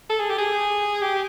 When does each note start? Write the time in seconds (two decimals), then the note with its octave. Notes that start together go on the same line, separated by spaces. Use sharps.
0.10 A4
0.20 G#4
0.30 G4
0.38 G#4
1.01 G4